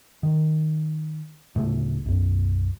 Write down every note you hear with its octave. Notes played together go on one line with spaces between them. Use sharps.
D#3
D1 A2 C#3 A3
B1 F#2